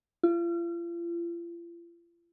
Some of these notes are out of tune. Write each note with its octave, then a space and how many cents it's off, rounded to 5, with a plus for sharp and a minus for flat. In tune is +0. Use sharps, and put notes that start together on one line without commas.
F4 -40